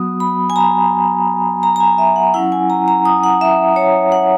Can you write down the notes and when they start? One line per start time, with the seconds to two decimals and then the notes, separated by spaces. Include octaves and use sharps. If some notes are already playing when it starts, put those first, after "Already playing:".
Already playing: F#3 B3 F#4 D#6
0.20 B5
0.50 G#5
0.56 A#5
1.63 A#5
1.76 A#5
1.80 G#5
1.98 E5
2.16 F#5
2.34 F#3 C#4 E4 F#5
2.52 G#5
2.70 A#5
2.88 A#5
3.05 D#6
3.24 F#5
3.41 E5
3.76 C#5
4.12 F#5